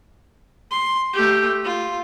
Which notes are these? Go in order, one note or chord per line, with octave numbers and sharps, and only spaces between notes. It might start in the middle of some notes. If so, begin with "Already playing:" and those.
C6
A3 G4
F4